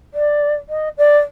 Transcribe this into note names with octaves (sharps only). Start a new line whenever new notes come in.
D5
D#5
D5